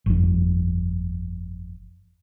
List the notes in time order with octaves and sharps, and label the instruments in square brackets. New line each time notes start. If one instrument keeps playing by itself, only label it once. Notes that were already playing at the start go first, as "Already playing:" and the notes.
[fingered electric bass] G1 F2